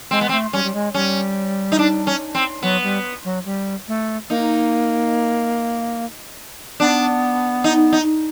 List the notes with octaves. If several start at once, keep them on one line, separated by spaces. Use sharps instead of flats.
G#3 C4
B3
C4
A3
G3 C#4
G3
G#3
G3 C#4
D#4
D4
C#4
C4
F#3 B3
G3
F#3
G3
A3
A#3 D#4
B3 D4
D#4
D#4